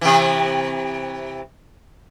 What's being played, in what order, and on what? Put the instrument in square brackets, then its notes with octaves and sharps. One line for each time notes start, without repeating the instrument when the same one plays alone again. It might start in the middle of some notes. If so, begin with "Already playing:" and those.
[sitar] C3 E3